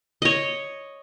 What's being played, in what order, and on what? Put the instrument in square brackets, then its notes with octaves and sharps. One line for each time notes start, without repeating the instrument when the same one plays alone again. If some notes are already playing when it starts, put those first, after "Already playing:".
[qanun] C#5 D#5